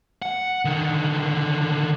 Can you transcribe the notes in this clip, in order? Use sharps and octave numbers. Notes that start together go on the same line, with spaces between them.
F#5
D3 D#3